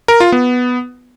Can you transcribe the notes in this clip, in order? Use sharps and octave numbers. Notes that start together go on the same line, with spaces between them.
A#4
F4
B3